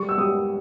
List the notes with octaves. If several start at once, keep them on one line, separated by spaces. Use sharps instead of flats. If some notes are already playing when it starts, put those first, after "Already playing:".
Already playing: G3 C#6
E6
G3 D#6